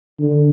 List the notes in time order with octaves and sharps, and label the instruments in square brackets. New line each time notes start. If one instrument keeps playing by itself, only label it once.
[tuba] D3